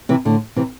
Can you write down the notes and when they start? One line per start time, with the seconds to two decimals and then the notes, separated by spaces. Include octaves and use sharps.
0.09 C3 E3
0.25 A2 D3
0.56 C3 E3